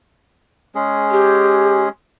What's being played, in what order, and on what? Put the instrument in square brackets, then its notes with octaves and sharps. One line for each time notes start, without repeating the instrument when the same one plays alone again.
[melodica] G#3 C#4 G#4
[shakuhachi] G4